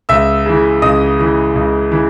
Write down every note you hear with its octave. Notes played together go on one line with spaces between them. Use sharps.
C#2 E5 E6
C#3 E3
C#2 D#5 D#6
C#3 E3
C#2
C#3 E3